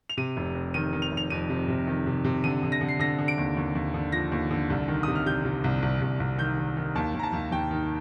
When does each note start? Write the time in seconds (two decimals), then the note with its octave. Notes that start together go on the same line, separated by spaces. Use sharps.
0.09 F7
0.17 C3 D#7
0.37 F1
0.55 C3
0.74 D#3 D#7
0.93 D#3
1.02 F7
1.12 F1
1.17 F7
1.30 F2 D#7
1.49 C3
1.68 C3
1.87 D#3
2.06 C3
2.24 C3
2.44 D3 D#7
2.63 D3
2.72 A#6
2.81 D3
2.88 C7
2.99 D3 A#6
3.19 D3
3.28 D7
3.38 D#2
3.57 D#2
3.75 D#2
3.94 D3
4.12 F3 A#6
4.32 D#2
4.51 D3
4.70 C2
4.88 D#3
5.03 C3 D#6
5.15 F6
5.26 C3 G6
5.44 C3
5.64 C2
5.82 C2
6.02 C2
6.20 C2
6.38 D#3 G6
6.57 D#3
6.77 D#3
6.95 D#2 A5
7.14 D#2
7.19 A#5
7.23 A5
7.33 D#2
7.51 D#2 G5
7.71 D#3